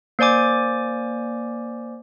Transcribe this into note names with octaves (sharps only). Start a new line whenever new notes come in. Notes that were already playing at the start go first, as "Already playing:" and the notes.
A#3 C5 D5 G#5 D6